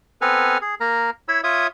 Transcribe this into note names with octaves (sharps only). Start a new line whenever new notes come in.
B3 C4 A4 B4 G#5 F6
G#4
A#3 A#4 A#5
E4 C#5 B5 E6
F4 C#5 E5 D#6